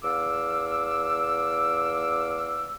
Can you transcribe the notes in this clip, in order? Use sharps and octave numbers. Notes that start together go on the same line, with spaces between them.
E2 F5 D6 E6